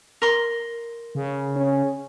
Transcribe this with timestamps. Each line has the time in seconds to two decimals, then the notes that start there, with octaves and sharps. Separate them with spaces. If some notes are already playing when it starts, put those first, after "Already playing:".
0.22 A#4 C6
1.15 C#3
1.56 C#4